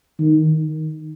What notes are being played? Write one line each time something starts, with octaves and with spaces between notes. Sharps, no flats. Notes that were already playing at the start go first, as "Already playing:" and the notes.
D#3